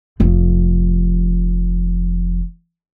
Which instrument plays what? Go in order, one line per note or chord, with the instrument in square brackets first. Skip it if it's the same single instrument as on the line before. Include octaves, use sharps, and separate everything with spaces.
[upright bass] F1 F3